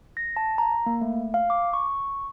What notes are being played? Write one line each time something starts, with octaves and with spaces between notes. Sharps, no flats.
A#6
A5
A#5
A#3
A3
F5
D6
C#6